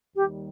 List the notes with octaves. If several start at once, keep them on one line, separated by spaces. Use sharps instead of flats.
D#2 D#3 G3 G4